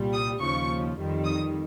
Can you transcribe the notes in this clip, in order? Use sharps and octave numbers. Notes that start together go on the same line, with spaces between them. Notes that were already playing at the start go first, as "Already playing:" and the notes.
Already playing: C2 A#2 G3
D#6
D#2 C#3 F3 C#6
F2 D#3 G3
D#6